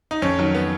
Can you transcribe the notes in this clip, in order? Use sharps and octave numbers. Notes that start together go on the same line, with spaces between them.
D#4
F2 C#4
D#3 F#3
B3